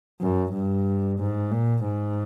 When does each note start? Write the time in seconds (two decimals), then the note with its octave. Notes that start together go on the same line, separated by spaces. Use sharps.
0.21 F#2
0.53 G2
1.19 G#2
1.51 A#2
1.84 G#2